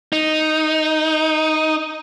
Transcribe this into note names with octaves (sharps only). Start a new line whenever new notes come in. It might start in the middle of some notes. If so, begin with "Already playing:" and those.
D#4